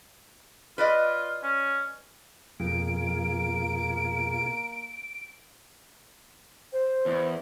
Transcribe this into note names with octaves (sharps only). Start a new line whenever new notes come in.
F4 B4 D5 D#5
C#4
F2 B2 A#3 F4 G#4 D7
C5
E2